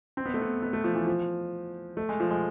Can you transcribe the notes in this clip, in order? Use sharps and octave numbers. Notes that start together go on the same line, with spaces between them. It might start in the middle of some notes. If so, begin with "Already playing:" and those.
C4
B3
A3
B3
B3
A3
F3
E3
F3
A3
G#3
F3
G#3